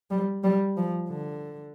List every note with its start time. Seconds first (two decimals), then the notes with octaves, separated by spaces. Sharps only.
0.11 G3
0.44 G3
0.77 F3
1.09 D3